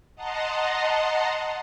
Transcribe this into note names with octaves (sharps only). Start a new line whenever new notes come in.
D#5 F#5 A5 A#5 C6